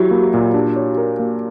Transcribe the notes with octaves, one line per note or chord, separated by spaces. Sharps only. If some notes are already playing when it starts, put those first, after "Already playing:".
Already playing: F#3 E4 F#4 G4
A#3
A#2
D4
C#5
A#4
A#3